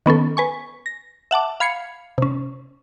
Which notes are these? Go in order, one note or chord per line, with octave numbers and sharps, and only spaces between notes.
D#3 B3 C#4 A4
B4 G#5 C#6
A#6
E5 F#5 A5 D6
F5 B5 G#6 C7 C#7
C3 C#4